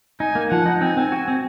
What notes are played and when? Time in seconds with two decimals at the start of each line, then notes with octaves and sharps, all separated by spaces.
0.20 D#4 G#5
0.35 A#3
0.51 F3 F#5
0.66 D#4
0.81 C4 G#5
0.97 C4
1.12 F#4
1.28 C4